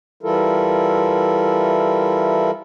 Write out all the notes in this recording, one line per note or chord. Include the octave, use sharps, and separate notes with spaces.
E3 G3 E4 F4 A4 A#4